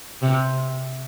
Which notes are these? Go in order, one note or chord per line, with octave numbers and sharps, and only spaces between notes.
C3